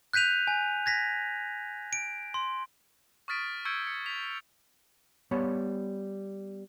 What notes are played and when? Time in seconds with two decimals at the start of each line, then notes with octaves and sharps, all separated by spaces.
0.13 F#6 G6 B6 D#7 F7
0.47 G#5
0.86 G#6 A#6 B6
1.93 D7
2.34 C6
3.28 C#6 D#6 F6 A6 B6 D7
3.65 C#6 E6 G6 G#6 C#7 D7
3.87 C#7
4.06 B6 F7
5.31 G3 B3 C#5